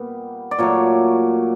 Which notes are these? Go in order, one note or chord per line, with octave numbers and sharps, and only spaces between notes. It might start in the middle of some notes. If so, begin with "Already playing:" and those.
Already playing: A#2 G3 B3
D5
A#2 F#3 A3 C#5